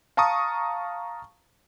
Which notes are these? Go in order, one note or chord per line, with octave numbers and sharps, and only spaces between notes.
F5 A5 A#5 C#6 D#6